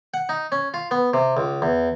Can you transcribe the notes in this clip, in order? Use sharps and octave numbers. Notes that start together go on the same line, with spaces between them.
F#5
D#4
C#4
F4
B3
C3
C#2
E2